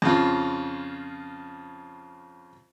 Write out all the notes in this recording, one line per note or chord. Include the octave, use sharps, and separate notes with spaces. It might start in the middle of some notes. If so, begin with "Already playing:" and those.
F2 C#3 F4